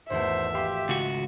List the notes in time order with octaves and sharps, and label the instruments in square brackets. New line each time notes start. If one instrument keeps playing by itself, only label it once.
[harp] G#1 E2 A3 [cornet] C5 [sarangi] E5
[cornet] G4 [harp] F5 C6
[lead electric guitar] C#2 F#4